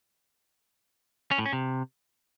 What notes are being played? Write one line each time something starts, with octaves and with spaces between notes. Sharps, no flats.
C#4
A2
C#4
C3